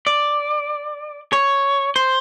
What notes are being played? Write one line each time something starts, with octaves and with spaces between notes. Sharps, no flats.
D5
C#5
C5